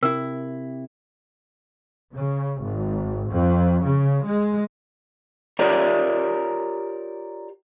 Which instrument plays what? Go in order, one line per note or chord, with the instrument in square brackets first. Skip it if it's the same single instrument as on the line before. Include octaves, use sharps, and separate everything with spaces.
[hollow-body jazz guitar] C3 E4 [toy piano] A#4
[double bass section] C#3
G#1
F2
C#3
G#3
[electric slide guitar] F4 G4 A#4 C#5 D5